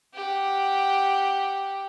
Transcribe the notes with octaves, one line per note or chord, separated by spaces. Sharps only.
G4 F#5